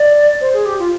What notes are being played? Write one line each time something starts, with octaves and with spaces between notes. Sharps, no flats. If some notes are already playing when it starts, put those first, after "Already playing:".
Already playing: D5
C5
G#4
G4
F4